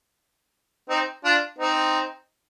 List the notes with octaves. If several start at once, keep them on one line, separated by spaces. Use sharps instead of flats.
C4 D#4
D4 F4
C4 D#4